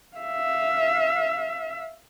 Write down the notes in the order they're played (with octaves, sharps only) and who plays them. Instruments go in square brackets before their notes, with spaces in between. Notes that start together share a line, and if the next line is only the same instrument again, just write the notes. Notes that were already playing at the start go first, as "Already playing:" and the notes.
[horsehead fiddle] E5 F5